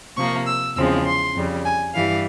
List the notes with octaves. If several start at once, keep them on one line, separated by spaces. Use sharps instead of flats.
C3 F3 A#3 C#6
E6
E2 C#3 F3 G#3 C4 E6
C6
F2 C#3 G3
G#5
G2 E3 G3 F5